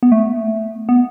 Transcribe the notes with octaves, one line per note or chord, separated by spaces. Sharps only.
B3
A3
B3